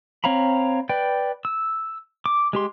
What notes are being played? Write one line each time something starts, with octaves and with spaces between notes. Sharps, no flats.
C4 C#5 F5 A#5 B5
B4 D5 G5
E6
D6
G#3 G4 C6